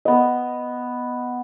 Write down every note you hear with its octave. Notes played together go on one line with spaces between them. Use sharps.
B3 D#5